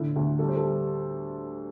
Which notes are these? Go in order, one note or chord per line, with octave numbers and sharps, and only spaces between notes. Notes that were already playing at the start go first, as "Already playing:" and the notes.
Already playing: A2 D3 E4
D2
G3 A4
C5
A4
G3